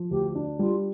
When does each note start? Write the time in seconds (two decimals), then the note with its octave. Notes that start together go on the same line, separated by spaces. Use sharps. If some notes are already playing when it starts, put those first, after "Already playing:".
Already playing: F3
0.11 D2 G4
0.35 D4
0.59 G3 F4